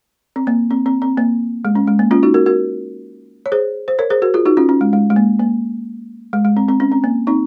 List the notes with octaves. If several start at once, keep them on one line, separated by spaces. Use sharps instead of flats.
C4
A#3
C4
C4
C4
A#3
G#3
C#4
G#3
A#3
C#4 F4
D#4 F#4
F#4 A#4
F#4 A#4
C#5
G#4 C5
C5
A#4 C#5
G#4 C5
F#4 A#4
F4 G#4
D#4 F#4
C#4 F4
C#4
G#3
G#3
G#3
A#3
A#3
G#3
G#3
C4
C4
C#4
C4
A#3
C4 D#4